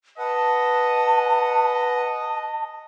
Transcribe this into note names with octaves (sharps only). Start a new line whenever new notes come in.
B4 D#5 F#5 A5